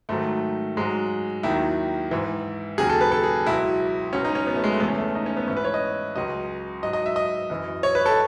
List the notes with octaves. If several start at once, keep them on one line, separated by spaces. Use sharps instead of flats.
G#2 D#3 F#3 A3
G#2 F#3 G#3
D#2 D#3 F#3 E4
G#2 E3
D#2 C#3 F#3 G#4
A4
B4
A4
G#4
C#2 B2 F#3 E4
C#2 B2 F#3 C#4
D#4
C#4
B3
A3
G#3
A3
E2 C#3 E3 B3
C#4
A3
D#4
C#4
B3
G#2 E3 C#4
B4
C#5
D#5
C#2 C#3 F#3 D#5
G#2 F#3 D#5
D#5
E5
D#5
F#2 E3
C#5
B4
A4